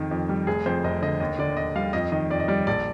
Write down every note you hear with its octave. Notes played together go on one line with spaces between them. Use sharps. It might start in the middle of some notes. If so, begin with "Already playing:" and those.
Already playing: F2 D#3 F3
F2
G3
F1 G#4
F2 C5
F1 D#5
D3 D#5
D#2 D#5
D3 D5
D#2 D#5
G3 F5
F2 D#5
D#3 D#5
F2 D5
D#5
G3 D5
A#1 D5